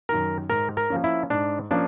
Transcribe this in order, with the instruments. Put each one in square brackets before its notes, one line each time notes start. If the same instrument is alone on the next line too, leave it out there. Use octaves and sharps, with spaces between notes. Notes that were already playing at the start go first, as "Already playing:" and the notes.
[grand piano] F#2 D#3 [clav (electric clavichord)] A#4
[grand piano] G#2 [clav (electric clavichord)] A#4
[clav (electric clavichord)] A#4
[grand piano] F3 A#3 C#4
[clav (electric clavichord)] E4
[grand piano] G#2 [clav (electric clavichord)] D4
[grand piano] F3 A#3 C#4 [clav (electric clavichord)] D4